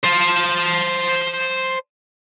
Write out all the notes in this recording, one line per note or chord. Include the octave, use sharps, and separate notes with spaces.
C5 A5